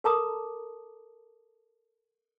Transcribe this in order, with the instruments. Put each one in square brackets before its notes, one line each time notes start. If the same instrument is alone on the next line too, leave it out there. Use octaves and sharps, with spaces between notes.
[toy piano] A4 A#4 A5 A#5 D6 D#6